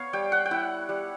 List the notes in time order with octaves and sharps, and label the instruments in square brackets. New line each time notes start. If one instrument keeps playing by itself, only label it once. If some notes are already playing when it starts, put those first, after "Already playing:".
Already playing: [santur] B3 C#5 F5
G3 G5
F#5
G5
E4 F#5
G3